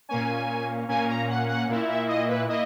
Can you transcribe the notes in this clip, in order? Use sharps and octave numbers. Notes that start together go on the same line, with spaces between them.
A#2 A#3 C#4 G#5
A#2 A#3 C#4 G#5
A#5
F#5
F#5
A#2 A#3 E4
E5
D#5
B4
A#3 E4 D#5